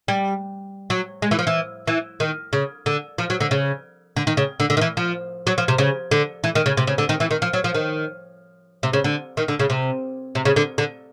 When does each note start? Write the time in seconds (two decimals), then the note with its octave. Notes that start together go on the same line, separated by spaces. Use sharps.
0.08 G3
0.90 F#3
1.22 G#3
1.31 E3
1.39 F3
1.47 E3
1.88 E3
2.20 D#3
2.53 C#3
2.86 D3
3.18 F3
3.30 F#3
3.41 D3
3.51 C#3
4.17 D3
4.27 D#3
4.37 C#3
4.60 D3
4.70 D3
4.77 D#3
4.81 E3
4.97 F3
5.47 F#3
5.58 F3
5.68 C3
5.78 C#3
6.11 D3
6.44 E3
6.55 D#3
6.66 C#3
6.77 C3
6.87 C#3
6.98 D3
7.09 D#3
7.20 E3
7.31 D#3
7.42 F3
7.53 F#3
7.64 F3
7.75 D#3
8.83 C3
8.93 C#3
9.04 D3
9.37 D#3
9.48 D3
9.60 C#3
9.70 C3
10.35 C3
10.45 C#3
10.56 D3
10.78 D3